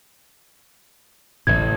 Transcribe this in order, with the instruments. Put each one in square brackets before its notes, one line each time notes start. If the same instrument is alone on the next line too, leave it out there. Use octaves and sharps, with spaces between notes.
[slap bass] A1 A2 C#3 [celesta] G#6